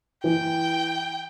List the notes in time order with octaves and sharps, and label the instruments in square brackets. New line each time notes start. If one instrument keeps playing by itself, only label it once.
[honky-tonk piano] E3 [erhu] G5